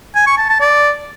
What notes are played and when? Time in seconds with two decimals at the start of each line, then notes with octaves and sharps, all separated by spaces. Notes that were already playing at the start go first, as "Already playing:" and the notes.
0.15 G#5
0.27 C#6
0.38 A5
0.49 A5
0.61 D5